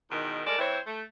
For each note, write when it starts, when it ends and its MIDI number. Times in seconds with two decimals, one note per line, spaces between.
0.11 0.43 40
0.11 0.43 44
0.11 0.43 47
0.11 0.43 51
0.47 0.58 56
0.47 0.58 57
0.47 0.58 69
0.47 0.58 70
0.47 0.58 74
0.58 0.78 52
0.58 0.78 60
0.58 0.78 64
0.58 0.78 72
0.58 0.78 73
0.87 1.02 57